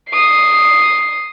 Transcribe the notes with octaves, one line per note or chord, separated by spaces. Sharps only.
D#6 C7